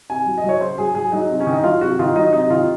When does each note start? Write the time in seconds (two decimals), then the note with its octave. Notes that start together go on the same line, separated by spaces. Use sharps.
0.10 C3 G#5
0.26 F#3
0.38 D#5
0.44 F#3 C#5
0.61 C#3 C5
0.78 F#3 G#4
0.95 F#3 G#4
1.12 F#3 D#4
1.29 C3
1.40 C#4
1.47 D#3
1.53 D#4
1.64 F#3 F4
1.81 C3 F#4
1.99 D#3 F4
2.16 F#3 D#4
2.33 C3 D#4
2.50 D#3 F4